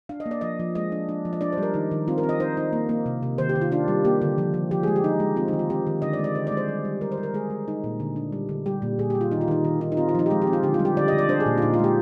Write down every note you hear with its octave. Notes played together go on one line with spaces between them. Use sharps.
D4 F5
D#5
A#3
D5
F3 D#5
F3
G#3 D#5
D4
D4
F3
D#5
D4 D5
C5
G3
A#4
D#3 D#4
D#3
C4 F4
A#4
C4
D#5
D#4 C5
D#4
A#3
A#3
C3
C3
D#3 C5
G4
D#3
F4
D4 F4
G3
A#3 G4
D3
F3
F3
F3 G4
G#3 G#4
G4
D#4
G#3
C4 F4
D#3 D#4
F4
C4 G4
D#3
D3 D#5
D5
G#3
D5
D3 C5
D5
G#3
C5
G3
G3
G3 A#4
C5
G3
A#4
G#3 G#4
G#3
D#4
A#2
D3
D4
G3
D3
G3 G4
A#2
A#2 G#4
G3 G4
F4
D#3 D#4
F4
D#3 D#4
D#3
D#4
D#4
C4 F4
F4
F3 D#4
G4
G#3 F4
G4
C4
F4
D3 G4
F4
G3
G4
D3 D5
D3 D#5
D5
D4 C5
G#4
A#2
F4
A#2 D#4
F4
G#3 G4